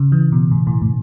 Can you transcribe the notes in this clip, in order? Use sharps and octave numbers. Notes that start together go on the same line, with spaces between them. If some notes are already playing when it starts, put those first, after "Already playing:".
Already playing: C#3
E3
B2
A2
A2
A2